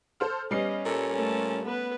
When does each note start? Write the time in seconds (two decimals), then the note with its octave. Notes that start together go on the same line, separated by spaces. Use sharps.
0.20 A4 C5 F6
0.51 G3 B3 C#4 D#5 C7
0.86 A#2 A4
1.15 A3 A5
1.66 B3 B4